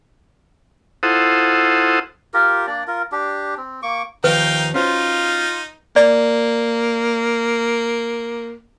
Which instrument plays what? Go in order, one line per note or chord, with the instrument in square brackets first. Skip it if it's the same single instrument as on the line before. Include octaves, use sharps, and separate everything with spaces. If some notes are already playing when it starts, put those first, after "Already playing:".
[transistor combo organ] E4 F4 A4 C5 F#5 D#6
[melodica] F4 G4 A#4
A#3 D4 D5
F4 A#4
D4 G4
C4
A#3 C#6 D6
[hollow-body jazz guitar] D#2 D#3 F3 [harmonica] D#4 F5 G5 [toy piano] B4
[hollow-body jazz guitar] C#4 F#4 C5 [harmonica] D#4 [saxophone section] F4
[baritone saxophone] A#3 [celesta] D5